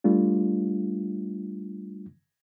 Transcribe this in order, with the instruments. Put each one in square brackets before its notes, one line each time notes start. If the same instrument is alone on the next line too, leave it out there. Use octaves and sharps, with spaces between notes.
[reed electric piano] G3 A3 D4 F4